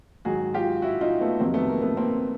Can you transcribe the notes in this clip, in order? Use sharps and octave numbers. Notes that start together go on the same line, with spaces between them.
G#2 D#3 F#3 F#4 G#4
F4 G4
E4 F#4
D#4 F4
A3 B3
F2 C3 D#3 F#3 A#3 C4
A3 B3
A#3
A3 B3
A#3 C4